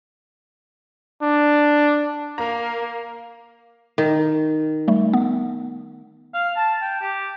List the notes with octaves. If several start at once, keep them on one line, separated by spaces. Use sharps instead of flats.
D4
A#3 A#5
D#3
G3 A3
B3
F5
A5
G5
G4